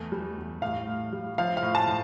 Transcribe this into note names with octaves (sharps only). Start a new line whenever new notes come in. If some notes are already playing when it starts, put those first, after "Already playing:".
Already playing: E2 A3
G3
E2
A2 F5
A2
G3
F3 F5
F5
A2
A5
A2